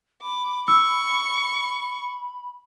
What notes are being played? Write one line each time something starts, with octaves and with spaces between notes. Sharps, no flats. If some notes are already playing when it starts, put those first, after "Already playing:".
B5 D6
C#6 E6